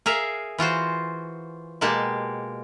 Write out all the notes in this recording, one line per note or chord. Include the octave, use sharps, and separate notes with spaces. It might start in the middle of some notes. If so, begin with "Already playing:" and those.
G#4 A#4 E5 F5
E3 F4 F#4 C5
B2 G#3 A#3 G4 A5